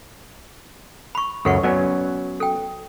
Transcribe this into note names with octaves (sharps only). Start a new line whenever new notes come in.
B5 C#6
C#2 F#2 A4 C#5 F#5 C#6
F#3 B3 C#4 D5
A4 G5